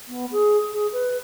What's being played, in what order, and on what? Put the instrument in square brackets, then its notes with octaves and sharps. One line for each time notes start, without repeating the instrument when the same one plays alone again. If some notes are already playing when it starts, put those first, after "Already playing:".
[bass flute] B3
G#4
G#4
B4